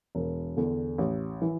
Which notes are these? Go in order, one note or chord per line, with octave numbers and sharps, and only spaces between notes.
E1
E2 D3
A1
E3